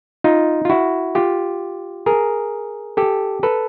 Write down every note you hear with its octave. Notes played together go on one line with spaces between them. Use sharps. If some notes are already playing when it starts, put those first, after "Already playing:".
D#4 F4
F4
E4 F#4
F4 G4
G#4 A#4
G4 A4
A4 B4